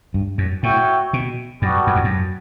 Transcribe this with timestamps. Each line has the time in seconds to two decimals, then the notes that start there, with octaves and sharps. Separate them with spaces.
0.14 G2
0.38 F#2
0.63 A2 F#4 C#5 E5 G5
1.13 B2
1.62 F#2 G3 B3 F#4 A4
1.87 F#2
1.96 E2
2.04 F#2